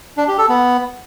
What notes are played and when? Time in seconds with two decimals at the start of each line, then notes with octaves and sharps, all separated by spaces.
0.17 D4
0.28 G4
0.38 A4
0.49 B3